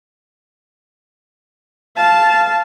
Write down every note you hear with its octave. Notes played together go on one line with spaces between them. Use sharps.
F5 A5